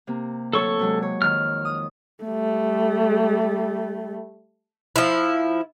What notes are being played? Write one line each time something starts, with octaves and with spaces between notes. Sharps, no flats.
C3 A#3
D2 F#3 A4 C#5 C#6
C3 F#3 G#3
C#5
F2 D#3 F6
D#6
G3 A3
F3 E4